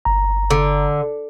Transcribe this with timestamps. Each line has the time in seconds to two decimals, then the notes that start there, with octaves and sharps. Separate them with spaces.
0.05 G1 A#5
0.51 D3